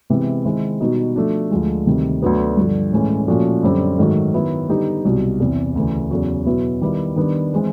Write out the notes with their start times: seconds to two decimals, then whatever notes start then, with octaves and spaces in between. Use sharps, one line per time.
0.10 C3 E3 G#3 B3 E4
0.45 D#3 G#3 C4 E4
0.80 B2 G3 B3 D#4 F#4
1.16 F3 A3 D4 F#4
1.51 D2 D3 F3 G#3
1.86 D2 C3 D#3 G3
2.22 D2 D3 F#3 B3
2.57 G2 D3 F3
2.92 A2 E3 G#3 C#4
3.27 A#2 F3 A3 C#4 F#4
3.63 F#2 D3 G3 C4
3.99 G#2 D#3 F#3 A3
4.34 D#3 F#3 B3 E4
4.69 D3 G3 B3 D#4 G4
5.04 C2 B2 F#3
5.40 E2 C3 E3
5.75 D2 C#3 E3
6.11 E2 C#3 F#3
6.46 B2 F#3 B3 E4
6.81 D#3 G3 B3 E4
7.16 D#3 G3 B3 D4
7.54 E3 G#3 C4